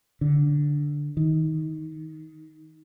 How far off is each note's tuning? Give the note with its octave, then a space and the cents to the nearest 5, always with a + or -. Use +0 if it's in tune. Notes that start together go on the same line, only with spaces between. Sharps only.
D3 -5
D#3 +15